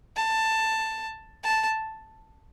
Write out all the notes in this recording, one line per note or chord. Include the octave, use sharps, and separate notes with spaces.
A5
A5